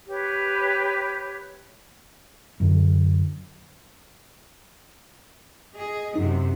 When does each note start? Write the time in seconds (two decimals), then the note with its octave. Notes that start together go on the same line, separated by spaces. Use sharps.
0.08 G4 B4 C#5
2.60 F#2 D3
5.76 G#4 D#5
6.16 F#2 C3 D#4